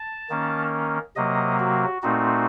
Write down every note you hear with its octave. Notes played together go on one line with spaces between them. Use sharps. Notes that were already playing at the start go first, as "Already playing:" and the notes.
Already playing: A5
D#3 A#3 C#4
C3 F#3 A#3 D#5
F#4
A#2 A3 C4 D#4 F#4